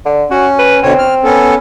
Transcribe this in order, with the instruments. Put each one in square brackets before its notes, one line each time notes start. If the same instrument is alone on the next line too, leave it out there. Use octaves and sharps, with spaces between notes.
[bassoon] D3
[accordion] C#4 [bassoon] F#4
[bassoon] B4
[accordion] B2 D3 C#5 [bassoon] C4
[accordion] F6
B3 C#4 A4